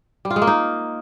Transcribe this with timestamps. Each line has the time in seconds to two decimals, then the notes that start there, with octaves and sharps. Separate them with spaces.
0.25 G3
0.30 F4
0.36 G#3
0.42 A#3
0.47 D#4